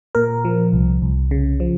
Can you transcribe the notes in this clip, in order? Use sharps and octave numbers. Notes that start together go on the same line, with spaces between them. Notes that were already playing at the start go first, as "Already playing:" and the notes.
A#2 A#4
F3
C2
C2
C#3
F3